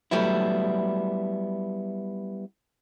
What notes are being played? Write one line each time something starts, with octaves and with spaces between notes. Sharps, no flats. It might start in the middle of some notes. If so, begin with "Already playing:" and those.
F#3 G3 A3 B3 E4